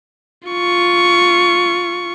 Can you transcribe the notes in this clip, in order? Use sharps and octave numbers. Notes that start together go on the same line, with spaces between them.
F4 C#6